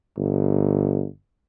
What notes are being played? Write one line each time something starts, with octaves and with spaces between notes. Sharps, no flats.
G1